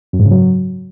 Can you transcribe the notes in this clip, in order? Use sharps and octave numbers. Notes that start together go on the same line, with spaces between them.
F#2
G#2
C#3
F#3